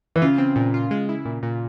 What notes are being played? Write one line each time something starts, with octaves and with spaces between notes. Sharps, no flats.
E3
C#3 F4
C4
A#2
F4
G#3
E4
A#2
A#2